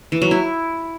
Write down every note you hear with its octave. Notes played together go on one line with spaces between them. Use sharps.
E3
F#3
E4